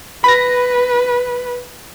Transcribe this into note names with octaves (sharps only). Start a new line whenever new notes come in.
B4 B5 A#6